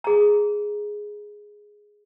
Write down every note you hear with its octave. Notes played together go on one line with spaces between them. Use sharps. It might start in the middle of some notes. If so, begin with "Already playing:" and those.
G#4 A#5